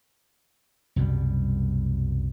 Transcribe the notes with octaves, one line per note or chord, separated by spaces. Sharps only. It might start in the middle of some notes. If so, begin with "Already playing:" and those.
C2 F#2 B2 G3